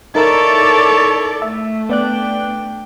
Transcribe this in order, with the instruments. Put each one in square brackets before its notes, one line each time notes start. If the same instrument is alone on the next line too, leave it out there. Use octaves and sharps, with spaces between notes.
[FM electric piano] D#4 A#4 E5 [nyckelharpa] E4 C#5 [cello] A4 D5
[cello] A3 [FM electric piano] E5
[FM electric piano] B3 D5 F#6 [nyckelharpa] D4 G5